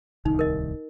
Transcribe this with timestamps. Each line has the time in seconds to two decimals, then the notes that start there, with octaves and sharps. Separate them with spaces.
0.25 D1 C2 D#3 D#4
0.39 A#4 D#5